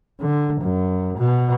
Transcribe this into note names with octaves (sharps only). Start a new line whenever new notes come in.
D3
F#2
B2